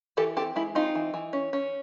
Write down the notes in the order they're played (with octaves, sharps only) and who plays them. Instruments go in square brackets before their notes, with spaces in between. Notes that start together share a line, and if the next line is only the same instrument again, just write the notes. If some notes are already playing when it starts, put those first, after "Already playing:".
[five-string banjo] E3 G4 A4
C4 G4 A4
G#3 E4
C4 D#4 F4
E3
E3
C#4
C#4